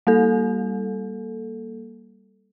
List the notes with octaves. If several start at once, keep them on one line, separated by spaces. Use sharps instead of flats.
G3 A#3 A4